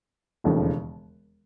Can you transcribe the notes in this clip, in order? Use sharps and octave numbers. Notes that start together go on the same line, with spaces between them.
E1 D#2 C#3 F3 A3